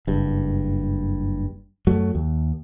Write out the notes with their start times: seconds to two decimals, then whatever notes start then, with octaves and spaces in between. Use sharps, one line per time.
0.07 F#1 G2
1.87 F#2 F#3 A3
2.15 D#2